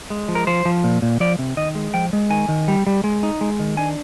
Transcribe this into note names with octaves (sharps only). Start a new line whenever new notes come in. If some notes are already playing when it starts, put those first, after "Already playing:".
G#3
F3
A#4
F3 C5
F3
A#2
A#2
F3 D5
C3
D#3 D#5
G#3
F3 G5
G#3
D#3 G#5
D#3
G3
G3
G#3
D#4
G#3
D#3
D4 G#5